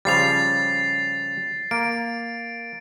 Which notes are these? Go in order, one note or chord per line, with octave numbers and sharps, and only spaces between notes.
C#3 F3 G3 A6 C7 F7
A#3 D7